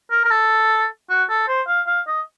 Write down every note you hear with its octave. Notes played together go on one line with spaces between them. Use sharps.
A#4
A#4
A4
F#4
A4
C5
F5
F5
D#5